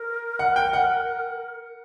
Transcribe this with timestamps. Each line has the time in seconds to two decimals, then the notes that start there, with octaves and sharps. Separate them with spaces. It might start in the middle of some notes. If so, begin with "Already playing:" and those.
Already playing: A#4
0.39 F#5
0.56 G5
0.73 F#5